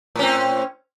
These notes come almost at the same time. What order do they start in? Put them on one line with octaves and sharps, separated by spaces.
A2 C#4 C4